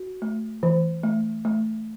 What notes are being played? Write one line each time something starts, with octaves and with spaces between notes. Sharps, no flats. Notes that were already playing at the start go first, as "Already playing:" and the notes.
Already playing: F#4
A3
E3
A3
A3